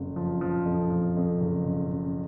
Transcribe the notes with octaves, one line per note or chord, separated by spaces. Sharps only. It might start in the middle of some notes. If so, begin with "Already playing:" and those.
Already playing: F#1 F2
F3
F3
F2
F3
F2
F#1
C#3
C#3